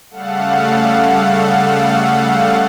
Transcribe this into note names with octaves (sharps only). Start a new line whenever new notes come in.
C#3 G3 A3 A4 F5 F#5